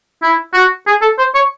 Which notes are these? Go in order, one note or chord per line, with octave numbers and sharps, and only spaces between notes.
E4
F#4
G#4
A4
C5
C#5